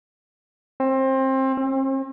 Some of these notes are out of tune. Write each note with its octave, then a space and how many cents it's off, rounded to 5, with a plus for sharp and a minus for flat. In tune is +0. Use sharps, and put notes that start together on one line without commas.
C4 +25
C4 +45